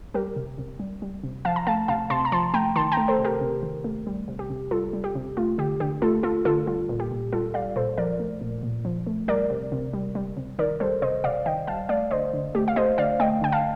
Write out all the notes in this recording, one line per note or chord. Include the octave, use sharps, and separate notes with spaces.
G3 G4 A#4
C3
C3
G3
G3
C3
F3 F5 A5
A#5
A3 F5 A5
C3 F5 A5
C3 A5 C6
A#5
F3 A5 C6
A3 G5 A#5
D#3 A5 C6
G5 A#5
A3
A4 C5
C3
G4 A#4
C3
D#3
A3
G3
C3
G4
C3
G3 F4 A4
G3
G4
C3
A3 F4
D3 G4
D3 G4
A3 F4 A4
A3 F4 A4
D3 F4 A4
G3 F4
A#2
G4
A#2
G3 F4 A4
G3 D5 F5
A#2 A4 C5
F3 A#4 D5
A3
A#2
A#2
F3
A3
G3 A#4 D5
C3
C3
G3
G3
C3
D#3 A#4 D5
G3 A4 C5
C3 C5 D#5
C3 D5 F5
D#3 D#5 G5
G3 F5 A5
A3 D5 F5
D3 C5 D#5
D3
A3 G4
F5
A3 C5 D#5
D3 D5 F5
A3 D#5 G5
D3 G5
F5 A5